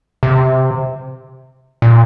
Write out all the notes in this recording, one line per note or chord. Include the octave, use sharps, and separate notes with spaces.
C3
A#2